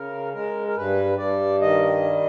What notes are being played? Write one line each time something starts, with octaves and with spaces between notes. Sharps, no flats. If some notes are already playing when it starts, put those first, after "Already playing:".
Already playing: C#3 A#4
G#3 A#4
A#4
G2 B4
G2 D5
D#3 D#5
G3